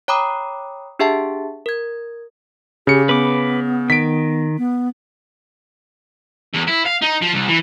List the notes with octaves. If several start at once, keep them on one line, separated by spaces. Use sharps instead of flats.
C#5 G5 A#5 B5 D6 D#6
D4 G4 G#4 E5 F#5 A5
A#4 G#6
C#3 G4 C#7
B3 B4 D6
D#3 B6 D7
B3
E2
E4
F5
D#4
F3
C2
E3